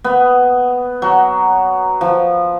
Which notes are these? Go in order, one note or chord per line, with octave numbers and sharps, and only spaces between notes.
B3
F#3
F3